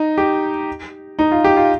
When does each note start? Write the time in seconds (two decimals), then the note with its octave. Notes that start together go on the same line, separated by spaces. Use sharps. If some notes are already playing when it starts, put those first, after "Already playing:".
Already playing: D#4
0.18 G4
1.19 D#4
1.32 F4
1.44 G4
1.57 F4